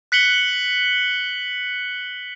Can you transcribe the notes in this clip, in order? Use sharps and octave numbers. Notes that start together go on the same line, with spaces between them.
F#6 B6 C#7 F#7 G7